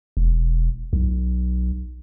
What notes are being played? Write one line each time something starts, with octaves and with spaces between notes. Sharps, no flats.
E1
B1